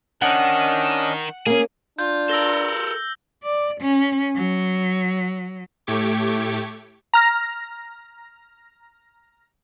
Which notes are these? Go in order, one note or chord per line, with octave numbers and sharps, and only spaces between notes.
D#3 C#4 D4 D#5 F#5
A#3 C#4 G#4
D4 F4 G6
A4 A#4 E6 A#6 G7
D5
C#4
F#3
A2 A3 G4 C#6 D6 G#6
A#5 F6 A#6